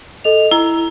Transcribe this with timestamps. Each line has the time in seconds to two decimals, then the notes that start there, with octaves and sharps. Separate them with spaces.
0.24 A4 D#5 F7
0.51 E4 A#5